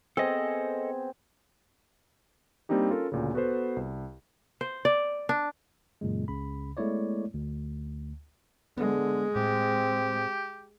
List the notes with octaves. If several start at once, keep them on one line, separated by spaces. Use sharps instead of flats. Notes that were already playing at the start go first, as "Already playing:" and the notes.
B3 C4 G#4 A4 D#5
G3 A#3 C4 D4 D#4 G4
C#4 F4 A4 A#4
D2 A#2 C#3
B3 F#4 A4 B4 C5
C2
C5
D5
D4
F#2 A#2 C#3 G#3
C#2 C#3 B5
G#3 A3 B3 E4 C#5 D5
D2
D3 G#3 B3
A2 C4 G4